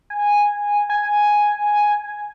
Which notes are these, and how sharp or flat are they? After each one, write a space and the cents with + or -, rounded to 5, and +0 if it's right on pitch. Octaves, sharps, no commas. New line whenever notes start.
G#5 -10
G#5 +0